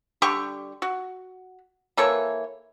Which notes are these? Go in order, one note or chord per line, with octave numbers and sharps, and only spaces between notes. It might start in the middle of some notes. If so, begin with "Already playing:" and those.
D3 G3 G4 C#6
F#4
E3 A#3 A4 C#5